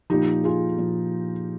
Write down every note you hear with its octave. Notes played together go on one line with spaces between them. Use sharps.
A#2 F3 D#4 G4
F4 G#4
A#2 F3